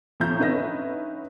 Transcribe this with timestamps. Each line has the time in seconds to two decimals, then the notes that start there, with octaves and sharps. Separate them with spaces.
0.20 A2 F3 E5 A#5 G6
0.39 D3 C#4 D#4 B4 E5 A#6